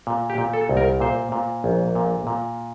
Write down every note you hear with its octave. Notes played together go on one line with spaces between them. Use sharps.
A#2
G4
A#2
A4
C2
A#4
A#2 C5
A#2
A#1
A#2
A#2